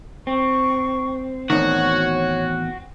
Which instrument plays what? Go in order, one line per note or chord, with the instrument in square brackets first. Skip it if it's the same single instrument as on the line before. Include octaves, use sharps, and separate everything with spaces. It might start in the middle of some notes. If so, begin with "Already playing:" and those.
[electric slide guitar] C4 [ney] C#6
[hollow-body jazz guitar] E2 A2 D#3 [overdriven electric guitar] F#4 [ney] C#5